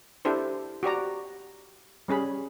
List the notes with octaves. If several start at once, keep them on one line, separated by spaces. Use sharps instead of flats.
D4 E4 G4 A4 C5
F#4 G4 D5 A#5
G3 C#4 G#4 B5